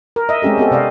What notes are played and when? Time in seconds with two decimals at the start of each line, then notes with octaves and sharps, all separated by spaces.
0.16 A#4
0.29 D#5 E5
0.42 G#3 C4 C#4 G4 A4
0.58 B3 C4 G4 A4
0.71 C3 D5 D#5 F5